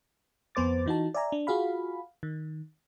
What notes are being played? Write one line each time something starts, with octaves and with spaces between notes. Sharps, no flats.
F2 B3 C5 D6 A6
E3 D#4 F#4 A5
D5 E5 G#5 A#5
D4
F4 F#4 G#4 F5 B5
D#3